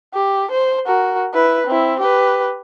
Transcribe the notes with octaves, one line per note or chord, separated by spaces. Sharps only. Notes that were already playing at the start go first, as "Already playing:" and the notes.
G4
C5
F#4 A#4
E4 B4
C4 E4
G4 B4